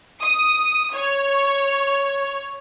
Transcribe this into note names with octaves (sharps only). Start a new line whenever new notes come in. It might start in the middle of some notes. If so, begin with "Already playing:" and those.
D#6
C#5